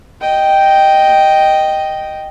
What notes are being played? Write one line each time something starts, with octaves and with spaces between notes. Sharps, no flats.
D#5 G5